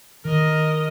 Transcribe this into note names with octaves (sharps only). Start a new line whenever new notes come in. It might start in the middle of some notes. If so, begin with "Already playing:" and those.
D#3 A#4 D#5